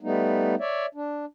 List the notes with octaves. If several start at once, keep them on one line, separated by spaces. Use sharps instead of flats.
G3 A3 B3 D#4
C#5 D5 E5
D4